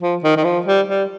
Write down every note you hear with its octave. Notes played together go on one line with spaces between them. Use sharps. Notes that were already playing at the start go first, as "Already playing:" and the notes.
F3
D#3
D#3
F3
G3
G3